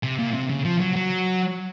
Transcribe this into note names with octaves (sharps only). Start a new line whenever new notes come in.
C3
A#2
C3
C#3
F3
F#3
F#3